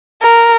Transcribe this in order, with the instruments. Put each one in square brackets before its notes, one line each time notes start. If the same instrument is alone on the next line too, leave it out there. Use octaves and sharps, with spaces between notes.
[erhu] A#4